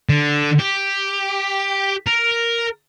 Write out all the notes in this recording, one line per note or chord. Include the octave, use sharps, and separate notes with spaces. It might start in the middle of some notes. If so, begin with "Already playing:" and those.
D3
G4
A#4